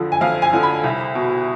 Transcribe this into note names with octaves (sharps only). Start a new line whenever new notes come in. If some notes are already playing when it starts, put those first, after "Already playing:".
Already playing: F2 D3 F3
G#5
F2 F5
G#5
D3 F3
B5
C2
B2